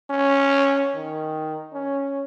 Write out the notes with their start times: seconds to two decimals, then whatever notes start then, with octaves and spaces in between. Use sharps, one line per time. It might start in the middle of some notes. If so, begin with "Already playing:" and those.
0.10 C#4
0.95 D#3
1.74 C#4